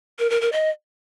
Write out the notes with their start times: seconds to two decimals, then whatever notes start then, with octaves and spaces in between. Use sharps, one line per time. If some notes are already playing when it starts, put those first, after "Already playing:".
0.19 A#4
0.30 A#4
0.41 A#4
0.53 D#5